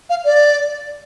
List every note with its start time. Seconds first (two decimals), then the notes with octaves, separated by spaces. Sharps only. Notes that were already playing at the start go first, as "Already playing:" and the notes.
0.09 F5
0.25 D5